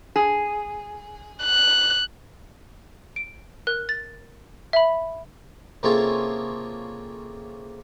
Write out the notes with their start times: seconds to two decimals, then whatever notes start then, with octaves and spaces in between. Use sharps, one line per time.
0.16 G#4
1.43 F#6
3.16 D7
3.67 A#4 F#6
3.89 A6
4.73 E5 B5
5.83 C3 A#3 C#4 F4 G#4 A4